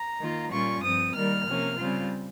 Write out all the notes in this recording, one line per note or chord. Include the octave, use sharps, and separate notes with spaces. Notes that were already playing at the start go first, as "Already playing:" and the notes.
Already playing: A#5
D#3 A#3 F4
A#2 G3 C#4 F4 C#6
G2 F3 C4 D#6
D#3 G3 A#3 F6
C3 F3 A#3 C#4
C#3 G3 C4 F4